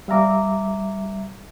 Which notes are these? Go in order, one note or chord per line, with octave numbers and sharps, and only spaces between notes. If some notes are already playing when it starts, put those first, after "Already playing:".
G3 E5 F5 A#5 D6